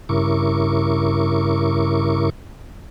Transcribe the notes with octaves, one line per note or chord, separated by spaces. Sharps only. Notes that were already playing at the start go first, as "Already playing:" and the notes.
G2 C#3 E4 A#4 C#6 D6